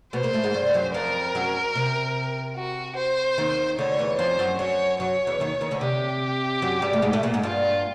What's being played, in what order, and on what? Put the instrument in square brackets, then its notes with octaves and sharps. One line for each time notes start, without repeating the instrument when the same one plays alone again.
[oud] B2 B3 [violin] C5
[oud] A#2 A#3
A2 A3
G#2 G#3
G2 G3
F#2 F#3
[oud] F2 F3 [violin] A#4
[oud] F#2 F#3
C3
[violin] F#4
C5
[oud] D#2 D#3
[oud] D2 D3 [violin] C#5
[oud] E2 E3
[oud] F2 F3 [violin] C5
[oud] F#2 F#3
[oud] F#2 F#3 [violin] C#5
[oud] F#2 F#3 [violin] C#5
[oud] E2 E3
D#2 D#3
D#2 D#3
D2 D3
[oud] C3 [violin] G4
[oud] F#2 F#3
G2 G3
A3
G#2 G#3
A2 A3
A#2 A#3
G#2 G#3
[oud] G2 G3 [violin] F4